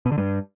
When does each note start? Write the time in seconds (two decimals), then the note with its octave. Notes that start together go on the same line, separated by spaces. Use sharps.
0.06 B2
0.12 D3
0.18 G2